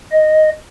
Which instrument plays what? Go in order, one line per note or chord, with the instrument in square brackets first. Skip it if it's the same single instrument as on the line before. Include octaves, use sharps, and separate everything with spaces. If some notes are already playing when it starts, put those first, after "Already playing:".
[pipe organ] D#5